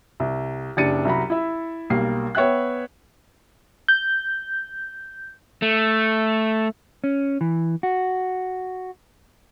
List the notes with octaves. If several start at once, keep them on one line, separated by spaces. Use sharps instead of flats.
C2
F#1 D4 G4 A6 C#7 D#7
C2 F#3 A#5 B5
E4 E5
B1 G3 A#3 C7
B3 C#5 E5 G5 F#6
G6
A3
C#4
E3
F#4